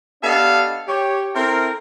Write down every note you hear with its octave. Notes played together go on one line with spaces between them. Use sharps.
B3 D4 G4 A4 D#5 F5
G4 C#5
C4 E4 A4 A#4